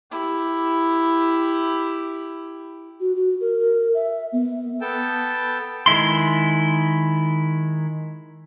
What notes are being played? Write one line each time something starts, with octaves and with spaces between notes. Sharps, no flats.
E4 G4
F#4
F#4
A#4
A#4
E5
B3
B3 A4 G5 A5
D#3 G#3 E4 C6